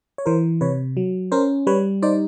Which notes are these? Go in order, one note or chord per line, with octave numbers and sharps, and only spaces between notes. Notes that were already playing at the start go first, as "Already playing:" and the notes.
C#5
E3 A#4 C5
C3 B4 C#5
F#3
C#4 A#4 C5
G3 B4 C#5
D#4 C5 D5